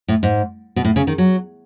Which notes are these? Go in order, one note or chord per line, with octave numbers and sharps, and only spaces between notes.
A2
G#2
B2
A2
C#3
D#3
F#3